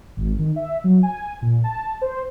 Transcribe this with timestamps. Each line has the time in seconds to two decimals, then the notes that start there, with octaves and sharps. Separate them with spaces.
0.16 G#1
0.39 D#3
0.56 E5
0.84 F#3
1.03 G#5
1.42 A#2
1.64 A5
2.02 C5